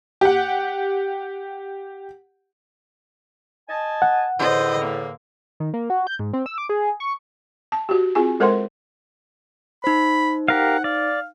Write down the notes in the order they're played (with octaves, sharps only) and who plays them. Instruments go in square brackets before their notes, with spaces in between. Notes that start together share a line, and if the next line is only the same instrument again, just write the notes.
[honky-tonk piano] G4 F#5
[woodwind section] D#5 G#5 A5
[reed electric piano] F#5
[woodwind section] E2 A2 D3 [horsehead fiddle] C5 D#5
[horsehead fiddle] A#3
[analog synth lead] D#3
A#3
F#4
G6
G#2
C4
E6
D6
G#4
C#6
[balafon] A5
F#4 G4
C4 F4 G#4 G#5
G#3 A4 A#4 C5 F#5 C6
[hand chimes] D#4 C5 [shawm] B5
[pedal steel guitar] G4 A#4 F5 [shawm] F#5
[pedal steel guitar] D5 [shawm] F5